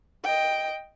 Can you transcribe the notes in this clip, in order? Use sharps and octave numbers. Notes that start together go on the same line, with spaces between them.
D#5 G5